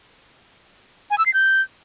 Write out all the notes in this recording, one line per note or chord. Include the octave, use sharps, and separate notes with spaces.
G#5
E6
C7
G6